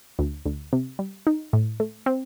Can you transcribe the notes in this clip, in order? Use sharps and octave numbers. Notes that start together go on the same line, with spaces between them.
D2
D2
C3
G3
D#4
A2
A3
C4